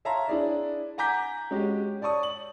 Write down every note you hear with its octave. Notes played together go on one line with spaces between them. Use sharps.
C#5 E5 F5 A5 A#5 C6
D4 E4 G#4 D5
F#5 G#5 A#5 D6 G6 B6
G#3 C#4 F#4 G4
C#5 D5 A5 C#6 D#6
F#7